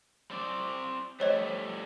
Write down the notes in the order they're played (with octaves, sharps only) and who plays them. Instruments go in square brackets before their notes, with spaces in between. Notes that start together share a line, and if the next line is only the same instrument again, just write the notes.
[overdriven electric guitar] C4 D5
[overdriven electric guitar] G3 A3 [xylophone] C5 C#5 D#5